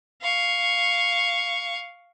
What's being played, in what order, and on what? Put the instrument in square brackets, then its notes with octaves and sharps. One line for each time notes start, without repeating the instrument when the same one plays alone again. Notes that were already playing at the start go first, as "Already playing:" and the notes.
[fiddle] F5 C#6